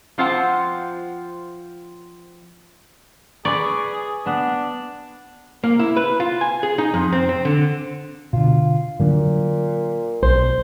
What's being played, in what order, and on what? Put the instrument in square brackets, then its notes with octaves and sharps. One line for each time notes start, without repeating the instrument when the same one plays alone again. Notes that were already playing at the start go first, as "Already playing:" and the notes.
[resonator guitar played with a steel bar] F3 C4 F4 C5 F#5 A5
[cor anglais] G#4 [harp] B4 B5 C#6 [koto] D5
[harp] B3 [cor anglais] D4
[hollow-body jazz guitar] A#3
E4
B4
F4
G#5
G#4
D#4
F2
C4
C4
D3
[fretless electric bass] B2 D3 [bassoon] F4
[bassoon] A#2 [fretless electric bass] D3 F#3 D4
[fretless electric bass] B1 [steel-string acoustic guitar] C5